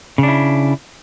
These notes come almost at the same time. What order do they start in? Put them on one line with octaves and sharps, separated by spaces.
C#3 D4 E4